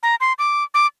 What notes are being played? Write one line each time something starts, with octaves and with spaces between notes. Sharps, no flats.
A#5
C6
D6
D6